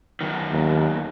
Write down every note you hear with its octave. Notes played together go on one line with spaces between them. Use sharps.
F#2 D#3
D#2